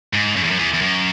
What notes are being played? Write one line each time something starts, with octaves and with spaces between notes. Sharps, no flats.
G#2
F#2
E2
F#2
E2
E2
F#2